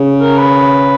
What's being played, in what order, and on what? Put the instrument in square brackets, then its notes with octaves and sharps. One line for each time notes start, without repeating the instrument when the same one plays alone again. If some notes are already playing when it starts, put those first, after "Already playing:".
Already playing: [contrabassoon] C#3
[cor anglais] A#4
B4